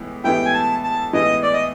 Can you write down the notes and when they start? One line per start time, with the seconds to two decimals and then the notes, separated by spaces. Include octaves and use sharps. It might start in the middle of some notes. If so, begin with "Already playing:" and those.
Already playing: A2 E3 G#3 B3
0.24 A2 E3 G#3 B3 E4 G5
0.45 G#5
0.54 A5
0.84 A5
1.13 A2 E3 G#3 B3 E4 D#5
1.43 D5
1.53 D#5